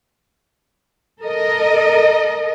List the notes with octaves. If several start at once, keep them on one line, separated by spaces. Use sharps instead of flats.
A4 A#4 D#5